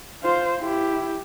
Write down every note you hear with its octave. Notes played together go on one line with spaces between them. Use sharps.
F4 C5
E4 G4